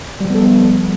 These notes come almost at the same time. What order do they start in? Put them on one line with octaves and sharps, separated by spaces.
G3 F3 B3 A4